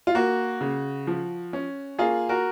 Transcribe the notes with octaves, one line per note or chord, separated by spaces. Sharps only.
F4
A#3 F#4
C#3
F3
C#4
A#3 F4 G#4
F#4 A#4